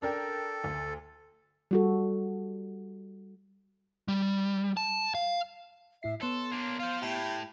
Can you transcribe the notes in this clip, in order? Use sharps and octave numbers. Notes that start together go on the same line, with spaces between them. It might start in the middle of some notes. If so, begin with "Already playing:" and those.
D4 A4 A#4 G5
D2
G3 F#4 A4
G3
A5
F5
A2 E4 E5 C7
B3 A4 C#5 C6
A#3 D4
F4 C5 F5
A2 E4 G4 A5